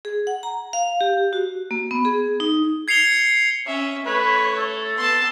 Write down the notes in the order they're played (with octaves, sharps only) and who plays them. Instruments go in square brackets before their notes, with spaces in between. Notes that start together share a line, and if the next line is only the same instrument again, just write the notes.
[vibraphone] G#4
F#5
A#5
F5
G4
F#4
A#3
B3
G#4
D#4
[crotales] G#6 C7 C#7 F7 G7
[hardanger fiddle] C#4 [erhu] E5
[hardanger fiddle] A3 [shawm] B4 [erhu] C#5
[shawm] A4
[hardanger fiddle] B3 A5 [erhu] C6